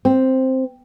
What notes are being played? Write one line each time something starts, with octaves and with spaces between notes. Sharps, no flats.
C4